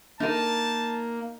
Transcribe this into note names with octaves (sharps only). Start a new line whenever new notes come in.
A#3 D#4 A#4 A5